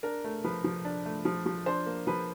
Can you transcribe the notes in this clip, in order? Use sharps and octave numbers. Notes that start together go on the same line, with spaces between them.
D4 A#4
A3
F3 B4
F3
D4
A3
F3
F3
D4 C5
A#3
F3 B4